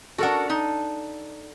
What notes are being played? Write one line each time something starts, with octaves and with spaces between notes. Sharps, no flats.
D4 F#4 A4 A#4 F#5
D#4